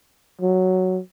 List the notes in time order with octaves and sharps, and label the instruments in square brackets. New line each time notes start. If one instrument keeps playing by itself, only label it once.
[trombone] F#3